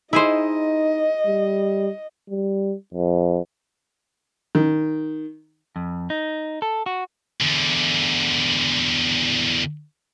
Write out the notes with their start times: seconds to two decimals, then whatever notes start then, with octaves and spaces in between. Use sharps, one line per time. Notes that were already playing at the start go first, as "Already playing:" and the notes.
0.13 D#4 E4 G#4 C5 D#5
1.26 G3
2.30 G3
2.94 F2
4.55 D#3
5.76 F2
6.10 D#4
6.62 A4
6.86 F#4
7.41 E2 D3